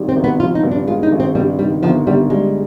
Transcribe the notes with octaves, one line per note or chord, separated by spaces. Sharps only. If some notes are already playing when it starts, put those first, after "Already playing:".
Already playing: G#1 D#3 G3
C4
G#1
B3
F3 F4
D#4
G2
D4
G#3 F4
D#4
G#1
C4
G2 G3
D#3 G3
G1 F3
G1 G3
G3 G#3